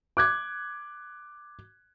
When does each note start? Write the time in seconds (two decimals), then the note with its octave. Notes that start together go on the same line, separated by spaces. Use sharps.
0.17 D6 F#6 G#6